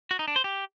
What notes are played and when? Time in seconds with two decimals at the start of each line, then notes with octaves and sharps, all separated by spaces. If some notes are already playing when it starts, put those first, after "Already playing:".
0.11 F#4
0.19 D#4
0.28 D4
0.36 C5
0.44 G4